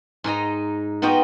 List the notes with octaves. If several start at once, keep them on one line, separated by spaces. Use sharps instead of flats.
G#2 D#4 D#5 A#5
B3 D#4 F4 F#4 D#5 G5